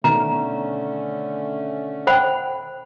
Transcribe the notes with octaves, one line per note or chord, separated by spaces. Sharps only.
B2 D3 D#3 A3 C#4 A#4 A#5
C5 F#5 G5 B5